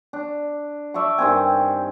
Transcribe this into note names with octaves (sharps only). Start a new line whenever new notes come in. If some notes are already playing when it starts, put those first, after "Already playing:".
D4
D5 E5 A5 C#6
G2 D#3 C4 G#5